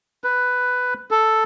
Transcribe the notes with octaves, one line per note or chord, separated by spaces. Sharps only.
B4
A4